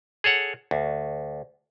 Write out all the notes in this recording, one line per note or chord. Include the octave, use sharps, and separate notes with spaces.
G#4 A4 C#5 F#5
D2